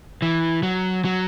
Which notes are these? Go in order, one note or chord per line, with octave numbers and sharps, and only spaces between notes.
E3
F#3
F#3